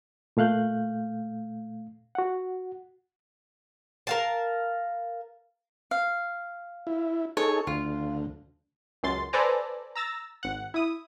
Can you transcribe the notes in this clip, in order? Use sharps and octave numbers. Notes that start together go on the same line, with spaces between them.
A#2 A3 F5 F#6 G6
F#4 F#5
A#4 F5 A5
F5
E4
D#4 G#4 A4 C#5
D2 F4
C#2 F#2 C6 A6
A4 B4 C5 D5 G#5 A#5
A#5 E6 A6 A#6
G#1 F#5
E4 D#6